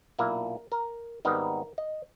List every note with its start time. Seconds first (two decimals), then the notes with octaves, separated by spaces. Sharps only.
0.19 B1 A#2 A#3 E4 A#4
0.72 A#4
1.25 G#1 G#2 G3 B3 D#4 A#4
1.78 D#5